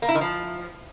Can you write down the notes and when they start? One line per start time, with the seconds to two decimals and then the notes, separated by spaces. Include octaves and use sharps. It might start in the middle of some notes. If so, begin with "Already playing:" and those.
0.02 A#3
0.09 E4
0.15 D#3
0.21 F3